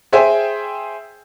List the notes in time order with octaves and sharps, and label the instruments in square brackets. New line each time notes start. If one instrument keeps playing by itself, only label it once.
[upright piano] G#4 C5 E5 G5 G#5